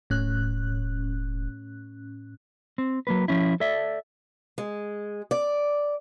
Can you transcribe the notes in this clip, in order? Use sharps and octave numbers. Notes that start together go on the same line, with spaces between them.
E1 A2 C#4 F#6
C4
F#3 A#3 B4
F3 C#4 E4
A4 D5 E5
G#3
D5